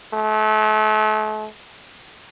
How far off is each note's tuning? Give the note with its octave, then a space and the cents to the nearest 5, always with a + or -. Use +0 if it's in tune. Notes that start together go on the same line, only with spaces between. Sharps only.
A3 -35